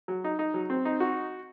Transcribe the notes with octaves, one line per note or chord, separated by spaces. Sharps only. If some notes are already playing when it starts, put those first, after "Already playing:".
F#3
D#4
D#4
F#3
C4
D#4
F#4